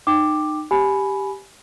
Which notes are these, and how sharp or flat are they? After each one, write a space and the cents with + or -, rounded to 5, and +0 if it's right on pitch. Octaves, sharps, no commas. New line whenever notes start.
D#4 -30 G5 +0 D6 +10
G4 +0 G#5 +20 B5 +0